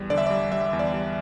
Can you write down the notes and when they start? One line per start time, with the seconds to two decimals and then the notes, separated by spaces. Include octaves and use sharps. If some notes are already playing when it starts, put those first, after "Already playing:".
Already playing: E2 G3
0.10 D3 D5
0.18 E5
0.27 D5
0.30 G3
0.52 G3 E5
0.73 E2
0.79 D5
0.94 G3